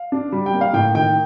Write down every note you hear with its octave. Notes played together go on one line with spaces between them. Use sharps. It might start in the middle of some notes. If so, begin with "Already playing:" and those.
Already playing: F5
D4
G3
G5
A#3
F5
A2 G5
D#3 G5